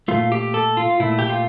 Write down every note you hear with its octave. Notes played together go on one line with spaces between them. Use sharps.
A#2 A3 F4
G4
A4
F4
A#2 A3 E4
G4
F4